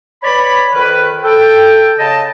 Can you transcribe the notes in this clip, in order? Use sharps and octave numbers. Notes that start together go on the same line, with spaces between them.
B4 C#5 D5 B5
F2 D#3 A#4 B4
A4 G5
C#3 D#5 A5